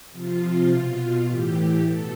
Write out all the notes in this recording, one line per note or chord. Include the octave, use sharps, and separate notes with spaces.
C3 F3 F4
B2
A2 E3 G4
B2 A4